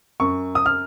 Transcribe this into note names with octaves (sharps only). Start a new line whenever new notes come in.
F#2 C#6
D#6
F6